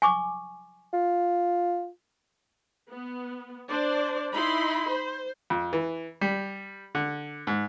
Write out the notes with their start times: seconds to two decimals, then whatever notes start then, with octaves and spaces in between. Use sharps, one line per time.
0.02 G#5 C#6 D6
0.93 F4
2.89 B3
3.67 D4 C5 D5
4.35 D#4 E4 B5 C6
4.90 C5
5.50 F2
5.73 E3
6.21 G3
6.95 D3
7.47 G#2